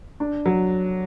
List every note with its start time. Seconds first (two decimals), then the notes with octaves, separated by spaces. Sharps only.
0.20 D4
0.46 F#3